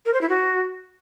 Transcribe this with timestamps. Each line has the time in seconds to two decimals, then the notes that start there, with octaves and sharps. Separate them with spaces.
0.06 A#4
0.14 C5
0.21 E4
0.29 F#4